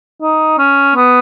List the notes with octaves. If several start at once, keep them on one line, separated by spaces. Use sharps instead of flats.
D#4
C#4
B3